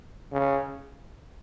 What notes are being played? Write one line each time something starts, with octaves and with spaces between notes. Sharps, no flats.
C#3